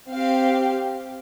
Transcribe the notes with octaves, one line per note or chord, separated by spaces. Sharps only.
C4 G4 F5